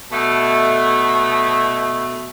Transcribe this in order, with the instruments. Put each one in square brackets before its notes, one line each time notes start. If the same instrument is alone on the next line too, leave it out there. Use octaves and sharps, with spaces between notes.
[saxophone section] B2 A3